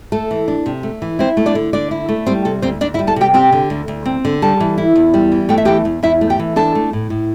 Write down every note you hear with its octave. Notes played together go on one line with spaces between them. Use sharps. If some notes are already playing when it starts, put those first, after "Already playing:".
A3 A4
E3
D4
C3
A3
E3
C4 E4 C5
A3
D4 D5
D3
D3 D4 D5
E4
A3
G3 C4 C5
C3 A4
D2 C4 C5
D2 D4 D5
E4 E5
G3
A4 A5
C3 G4 G5
C4 G4 G5
D3
D2
D2
C4
D3
G3 A4 A5
E3
E4
E2
G3
E3
A3 G5
E5
E3 G4 G5
E2
E2 E4 E5
A3
G4 G5
E3
D4 A4 A5
A3
A2
A2